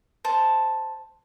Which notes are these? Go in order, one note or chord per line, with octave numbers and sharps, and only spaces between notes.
C5 A5